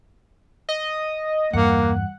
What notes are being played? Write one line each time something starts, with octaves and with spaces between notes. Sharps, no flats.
D#5
E2 G2 A#3 F#5